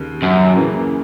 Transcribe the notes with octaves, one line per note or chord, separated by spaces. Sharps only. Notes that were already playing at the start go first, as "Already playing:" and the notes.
Already playing: D#2 C#3
F#2
C#3 E3 A#3